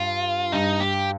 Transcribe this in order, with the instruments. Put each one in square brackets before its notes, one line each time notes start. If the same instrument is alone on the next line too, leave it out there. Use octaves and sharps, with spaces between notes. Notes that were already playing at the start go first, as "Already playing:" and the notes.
Already playing: [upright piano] G2 [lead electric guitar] F4
[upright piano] G2 [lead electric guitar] D#4
[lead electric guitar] G4